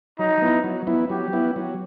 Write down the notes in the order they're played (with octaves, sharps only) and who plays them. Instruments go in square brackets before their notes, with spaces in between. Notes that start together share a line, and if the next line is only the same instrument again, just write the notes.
[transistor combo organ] F#3 [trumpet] D#4
[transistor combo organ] B3 E4
F#3
B3 E4
[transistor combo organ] F#3 [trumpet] G4
[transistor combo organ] B3 E4
F#3